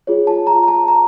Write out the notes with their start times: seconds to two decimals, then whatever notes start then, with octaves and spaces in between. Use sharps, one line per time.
0.07 F4 G#4 C#5
0.27 A5
0.47 A#5
0.63 A#5
0.68 A5
0.88 A#5